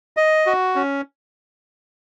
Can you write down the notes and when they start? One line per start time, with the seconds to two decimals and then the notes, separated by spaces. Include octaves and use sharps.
0.17 D#5
0.46 F#4
0.76 C#4